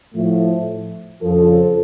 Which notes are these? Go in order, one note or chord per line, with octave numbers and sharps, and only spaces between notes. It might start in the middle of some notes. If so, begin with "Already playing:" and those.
A2 F3 A3
F2 C#3 F3 A4